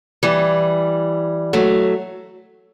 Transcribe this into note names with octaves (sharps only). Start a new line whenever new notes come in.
E3 G3
F#3 A3